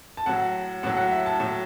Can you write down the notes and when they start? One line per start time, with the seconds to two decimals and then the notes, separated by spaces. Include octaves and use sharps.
0.17 A5
0.26 A2 F#3 F#5
0.83 A2 F#3 F#5
0.97 F#5
1.11 E5
1.26 A5
1.40 A2 F#3